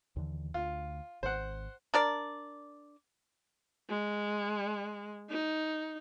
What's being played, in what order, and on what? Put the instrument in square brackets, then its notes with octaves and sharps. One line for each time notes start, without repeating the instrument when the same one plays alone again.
[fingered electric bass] D#2 D3 E3
[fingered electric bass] D2 [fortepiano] F4
[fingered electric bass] G#1 [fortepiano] C5 F#5
[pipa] D4 A#4 D5
[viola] G#3
D#4